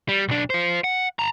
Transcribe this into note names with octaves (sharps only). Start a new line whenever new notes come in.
G3
B1 D4
F4 C5
F#5
A5 A#5